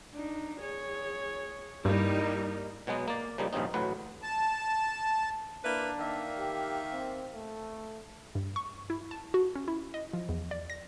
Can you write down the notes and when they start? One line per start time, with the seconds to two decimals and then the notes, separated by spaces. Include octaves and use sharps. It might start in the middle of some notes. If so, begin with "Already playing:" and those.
0.13 D4 D#4
0.61 G#4 C#5
1.85 G2 G3 A#3 D#4 E4
2.87 B2 F#3 G#3 B3
3.08 A#3 D5
3.38 C#3 F3 G3 A#3 D#4
3.53 A#1 G2 C#3 C4 D#4
3.74 A1 D2 A2 F#3 B4
4.23 A5
5.64 A#3 D4 E4 B4
5.98 D#3 A#3 E5
6.38 G4
6.93 C4
7.32 A3
8.35 G2
8.56 C#6
8.90 E4
9.11 A5
9.34 F#4
9.55 C#4
9.68 E4
9.94 D#5
10.13 F3
10.29 E2
10.51 D5
10.70 A#6